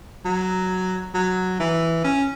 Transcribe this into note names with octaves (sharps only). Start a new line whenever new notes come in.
F#3
F#3
E3
C#4